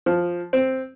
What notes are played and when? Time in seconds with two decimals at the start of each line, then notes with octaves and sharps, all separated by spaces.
0.06 F3
0.53 C4